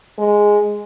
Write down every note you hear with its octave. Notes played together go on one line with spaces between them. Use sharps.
G#3